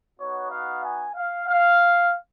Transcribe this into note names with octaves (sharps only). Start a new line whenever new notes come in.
B3 D#4 F#4 C#5
F5
G#5
F5
F5